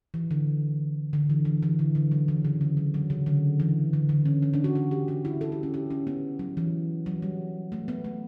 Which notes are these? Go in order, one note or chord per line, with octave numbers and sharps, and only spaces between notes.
E3
D3
D3
E3
E3
E3
D3
D3
F#3
E3
C#3
D3
F#3
F#3
C#3
D3
E3
D3
D3
C#4
C#4
D4
F#4
F#4
G4
F#4
E4
A4
G4
C#4
G4
C#4
B3
F#3
E3
F#3
G3
A3
B3
A3